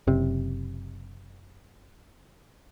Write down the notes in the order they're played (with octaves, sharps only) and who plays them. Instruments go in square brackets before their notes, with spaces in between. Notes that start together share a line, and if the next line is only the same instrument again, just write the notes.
[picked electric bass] F#1 C3